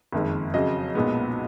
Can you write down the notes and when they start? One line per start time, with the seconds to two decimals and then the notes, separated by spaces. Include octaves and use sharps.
0.13 F#1 F2 D#3 G#3
0.54 F2 C#3 F#3 D#5
0.95 B1 A#2 G#3 B3